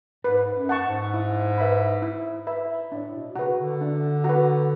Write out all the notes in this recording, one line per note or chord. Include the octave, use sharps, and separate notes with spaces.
G#2 B4
F#2
F#5 A5 C#6
G#2
E4
B4 E5 B5
E4
B4 E5 B5
A2 D4
B2
C#3 F#4 B4
D3
D4
F#4 B4